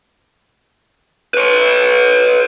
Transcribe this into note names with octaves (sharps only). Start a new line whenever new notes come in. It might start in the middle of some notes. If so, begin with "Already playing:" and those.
B4 C#5